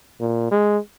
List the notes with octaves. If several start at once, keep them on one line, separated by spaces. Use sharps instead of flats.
A#2
G#3